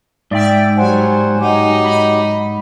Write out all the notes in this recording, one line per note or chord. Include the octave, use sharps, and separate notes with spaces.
G#2 D5 E5 G5
F#3 G3 C5 F#5 G#5
F#3 D#4 G4
B5